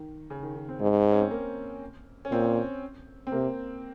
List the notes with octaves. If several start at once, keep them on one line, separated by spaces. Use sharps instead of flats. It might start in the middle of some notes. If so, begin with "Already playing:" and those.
Already playing: D#3
C#3
D#3
D#3
C4
G#2
C#4
C4
A#3
C#4
A#2 C4
C4
C3 A#3